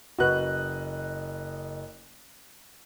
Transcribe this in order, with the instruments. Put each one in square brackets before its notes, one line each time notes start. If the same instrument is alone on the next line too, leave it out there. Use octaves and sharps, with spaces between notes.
[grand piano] F#1 D#5 F#6 [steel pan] F#4 B4